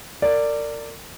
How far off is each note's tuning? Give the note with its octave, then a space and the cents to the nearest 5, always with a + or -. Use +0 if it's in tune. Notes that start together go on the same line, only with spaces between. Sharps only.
A#4 -35 D5 +0